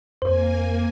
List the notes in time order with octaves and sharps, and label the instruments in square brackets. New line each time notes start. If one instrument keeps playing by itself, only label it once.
[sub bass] F2 [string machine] A#3 G#5 [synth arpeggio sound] C5